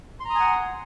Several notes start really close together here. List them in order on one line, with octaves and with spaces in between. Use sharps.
C6 A#5 D#6 G#5 F#5